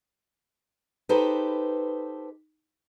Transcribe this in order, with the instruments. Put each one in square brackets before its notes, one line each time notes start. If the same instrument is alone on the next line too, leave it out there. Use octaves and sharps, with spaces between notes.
[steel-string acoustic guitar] D#4 G4 A4 B4 C5